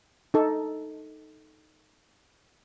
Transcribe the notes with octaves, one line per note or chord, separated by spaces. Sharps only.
D#4 A4